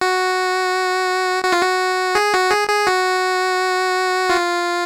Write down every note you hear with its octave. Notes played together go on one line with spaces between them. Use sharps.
F#4
F#4
F4
F#4
G#4
F#4
G#4
G#4
F#4
F4